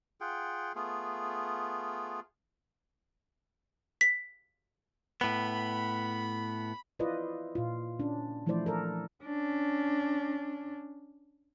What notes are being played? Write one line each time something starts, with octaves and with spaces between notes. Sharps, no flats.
F4 G#4 F#5 G5
A3 B3 F4 G#4
B6
A2 B3 B5
E4 F4 B4 C5 D5 D#5
A#2 F4
C#4 D4
E3 F3 A3 E4 C5 D5
A4 A#4 D5
C#4 D4